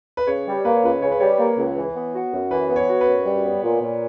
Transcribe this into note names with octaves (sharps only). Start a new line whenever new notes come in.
B4
C#3 C#5
G3
A#3 B4
C#5
C#2 B4
C#3 C#5
B4
G3 C#5
A#3
C#2
E3
B3
F#4
F#2
E3 B4
B3
C#5
F#4
B4
F#2
G3
B3
A#2
A#2